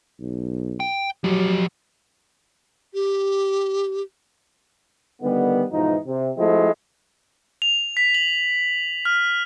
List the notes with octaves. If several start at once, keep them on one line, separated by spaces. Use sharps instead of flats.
B1
G5
F3 F#3 G4
G4
D3 D#3 G3 B3
G#2 B2 E3 F3 D#4
C3
F3 G#3 A3 C4 E4 F#4
F7
B6
F#7
F6